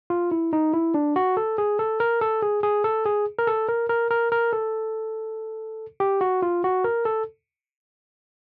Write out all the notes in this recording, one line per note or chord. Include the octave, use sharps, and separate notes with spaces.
F4
E4
D#4
E4
D4
F#4
A4
G#4
A4
A#4
A4
G#4
G#4
A4
G#4
A#4
A4
A#4
A#4
A#4
A#4
A4
G4
F#4
F4
F#4
A#4
A4